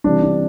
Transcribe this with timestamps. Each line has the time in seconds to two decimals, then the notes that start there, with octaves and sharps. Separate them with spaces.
0.04 C3 E3 G3 D4
0.23 D4